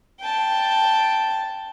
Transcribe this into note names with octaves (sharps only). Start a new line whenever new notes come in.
G5 A5